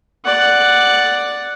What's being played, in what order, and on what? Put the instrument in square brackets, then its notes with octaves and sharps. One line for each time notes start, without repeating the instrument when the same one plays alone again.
[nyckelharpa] D5 F#5